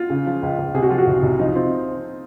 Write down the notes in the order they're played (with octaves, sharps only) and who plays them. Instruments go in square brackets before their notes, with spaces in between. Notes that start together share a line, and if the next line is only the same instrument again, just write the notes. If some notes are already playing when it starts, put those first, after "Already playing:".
Already playing: [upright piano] F4
[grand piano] C#3
F3
C#2
C#2
[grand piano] C3 [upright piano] G#4
[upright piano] F#4
[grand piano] F3 [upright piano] F4
[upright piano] F#4
[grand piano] C2
C2
[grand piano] F3 [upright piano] D#4
[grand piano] C4 [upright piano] F4